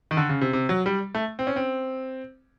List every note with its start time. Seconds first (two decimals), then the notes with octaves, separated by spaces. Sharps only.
0.11 D#3
0.17 D3
0.29 C#3
0.41 C3
0.53 C3
0.69 F#3
0.86 G3
1.15 A3
1.39 C4
1.47 C#4
1.56 C4